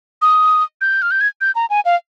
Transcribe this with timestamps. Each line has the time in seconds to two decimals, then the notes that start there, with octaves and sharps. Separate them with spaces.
0.22 D#6
0.81 G6
1.02 F6
1.11 G6
1.21 G#6
1.41 G6
1.55 A#5
1.70 G#5
1.85 F5